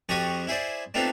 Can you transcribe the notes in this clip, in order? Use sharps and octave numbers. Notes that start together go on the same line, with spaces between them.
F2 F3 F#4 G4 C#6 D#6
E4 G#4 C5 D5
A3 B3 C4 D4 D#4 F4